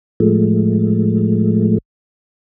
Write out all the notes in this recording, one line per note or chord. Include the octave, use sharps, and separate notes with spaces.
A2 F3 G#3 A3